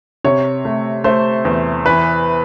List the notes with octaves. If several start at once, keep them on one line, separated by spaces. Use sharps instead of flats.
C3 C#5
A3
A3 C5
E2
E3 B4